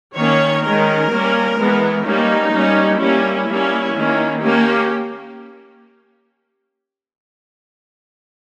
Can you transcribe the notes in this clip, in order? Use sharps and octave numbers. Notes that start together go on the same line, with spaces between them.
D#3 A#3 C#4 C#5
D#3 G#3 C#4 A#4
G3 A#3 C#4
E3 G#3 B3
G3 A#3 C#4 D#4
G3 A#3 C#4
G3 A#3 C#4 E4
G3 A#3 C#4
D#3 A#3 C#4
A#3 C#4 G4